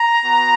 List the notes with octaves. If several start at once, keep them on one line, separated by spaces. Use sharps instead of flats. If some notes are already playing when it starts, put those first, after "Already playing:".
Already playing: A#5
B3 F#4